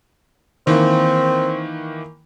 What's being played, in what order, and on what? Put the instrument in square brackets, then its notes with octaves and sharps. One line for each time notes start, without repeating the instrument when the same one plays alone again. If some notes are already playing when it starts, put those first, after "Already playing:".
[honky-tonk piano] D#3 E3 A#3 [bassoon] C4